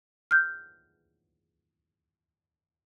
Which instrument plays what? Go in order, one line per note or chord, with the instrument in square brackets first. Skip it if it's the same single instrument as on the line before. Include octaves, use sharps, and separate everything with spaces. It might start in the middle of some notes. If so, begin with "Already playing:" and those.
[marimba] F6 G6